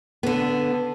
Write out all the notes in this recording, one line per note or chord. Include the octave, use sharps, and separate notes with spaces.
D3 B3